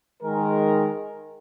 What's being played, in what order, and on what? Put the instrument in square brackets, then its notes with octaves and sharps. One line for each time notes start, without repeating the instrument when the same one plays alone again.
[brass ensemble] D#3 G#3 A#4